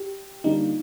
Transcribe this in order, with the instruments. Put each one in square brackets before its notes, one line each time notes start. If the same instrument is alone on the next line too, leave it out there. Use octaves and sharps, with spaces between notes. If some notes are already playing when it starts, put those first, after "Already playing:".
Already playing: [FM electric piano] G4
[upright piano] D3 G3 A#3 D4 F4 [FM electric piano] D#4